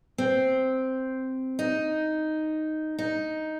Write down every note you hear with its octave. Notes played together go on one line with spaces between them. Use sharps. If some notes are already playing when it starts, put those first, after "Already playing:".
C4
D#4
D#4